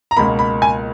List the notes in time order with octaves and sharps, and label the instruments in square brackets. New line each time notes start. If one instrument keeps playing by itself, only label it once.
[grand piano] A#5
C#2 B2 A#3 B5
B5
G#5